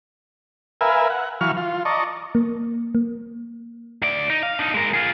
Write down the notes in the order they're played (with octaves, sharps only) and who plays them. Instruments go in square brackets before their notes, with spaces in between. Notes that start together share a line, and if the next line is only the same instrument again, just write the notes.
[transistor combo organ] A#4 B4 E5 F5 G#5
F#5
E3 F#3 F5 C#6 F6
F4
D5 D#5 A5 A#5 C#6
[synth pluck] A#3
A#3
[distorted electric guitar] D2 D5
D#4
F5
D4 D#4
G#3 A#4
F4 G#4